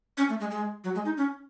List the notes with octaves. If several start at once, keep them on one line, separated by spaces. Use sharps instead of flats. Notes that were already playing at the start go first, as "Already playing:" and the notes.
C#4
A3
G#3
G#3
F#3
G#3
D#4
C#4